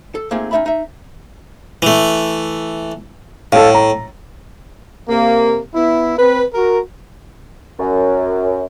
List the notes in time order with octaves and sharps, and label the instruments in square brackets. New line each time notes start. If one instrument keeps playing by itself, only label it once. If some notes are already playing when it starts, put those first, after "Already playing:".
[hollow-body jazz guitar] A4
A3 A#3 C4 D#4 F4 G#4
C#4 D#4 F4 E5 A5 B5
D#4 E5
[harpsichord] E3 A3
[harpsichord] A2 [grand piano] A4 F5
[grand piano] A#5
[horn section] C3 A#3
B3 E4
C4 B4
F#4 A#4
[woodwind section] F#2